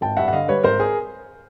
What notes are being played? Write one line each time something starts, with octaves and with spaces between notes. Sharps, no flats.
G#1 G5 A5
G2 E5 F#5
F#5
D3 D#5 F5
G3 B4 C#5
G#1 A#4 C5
G#4 A#4